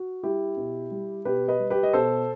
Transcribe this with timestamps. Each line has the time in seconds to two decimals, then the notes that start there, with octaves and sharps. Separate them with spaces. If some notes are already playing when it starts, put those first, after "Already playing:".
Already playing: F#4
0.23 G3 E4 G4
0.57 B2
0.91 G3
1.25 B2 G4 B4
1.48 B4 D#5
1.60 G3
1.70 G4 B4
1.83 D#5
1.93 B2 A4 C5